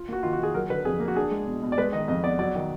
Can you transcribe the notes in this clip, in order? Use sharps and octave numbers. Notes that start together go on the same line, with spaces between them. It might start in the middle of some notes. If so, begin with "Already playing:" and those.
Already playing: F4
A#3 F#4
D#3 F4
F#4
D#3 G#4
F#3 A#4
D3 B4
F2 G#4
A#3
F#4
D4 G#4
G#3
B2
B2
D5
G#3 B4
D#3 D#5
F2 D#5
B3 D5
F#3 D5
D#3